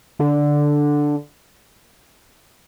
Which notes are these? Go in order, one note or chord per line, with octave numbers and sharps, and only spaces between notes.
D3